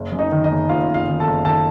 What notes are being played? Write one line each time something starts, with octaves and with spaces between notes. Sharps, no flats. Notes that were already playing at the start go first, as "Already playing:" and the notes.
Already playing: F#1
F#2
D#4 D#5
D#3
D#4 D#5
F#1
F#1 F4 F5
F#1
F4 F5
D#3
A4 A5
F#1
D#3 A4 A5